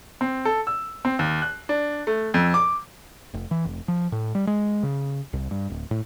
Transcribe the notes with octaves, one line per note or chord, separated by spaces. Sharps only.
C4
A4
E6
C4
D#2
F#6
D4
A3
F2
D6
F1
E3
F1
F3
A2
G3
G#3
C#3
C2
G2
D1
A2